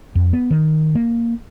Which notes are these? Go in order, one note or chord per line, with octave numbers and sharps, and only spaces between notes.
F2
B3
D#3
A#3